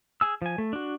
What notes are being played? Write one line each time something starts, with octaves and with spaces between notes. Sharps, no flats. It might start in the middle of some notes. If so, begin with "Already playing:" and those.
G#4 G#5 E6
F3 G#5
A3
D4 F#4